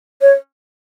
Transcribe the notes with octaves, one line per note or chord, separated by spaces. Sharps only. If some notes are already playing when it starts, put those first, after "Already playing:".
C#5